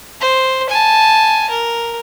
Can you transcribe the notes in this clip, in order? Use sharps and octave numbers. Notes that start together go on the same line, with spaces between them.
C5
G#5 A5
A#4